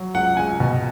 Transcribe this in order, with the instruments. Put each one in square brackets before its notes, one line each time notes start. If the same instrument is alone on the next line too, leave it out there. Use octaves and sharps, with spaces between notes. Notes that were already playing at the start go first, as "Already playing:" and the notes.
Already playing: [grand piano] F#3
C#2 F#5
C#2 G#5
B2